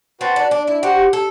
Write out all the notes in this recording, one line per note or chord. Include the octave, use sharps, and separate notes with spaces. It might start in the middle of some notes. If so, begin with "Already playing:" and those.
C4 F#4 B4 F#5 A5
D4
D4
E4
F#4 G4 C5 F#5
A4